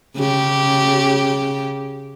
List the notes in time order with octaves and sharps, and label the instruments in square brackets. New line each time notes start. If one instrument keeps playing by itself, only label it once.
[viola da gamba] C#3 G4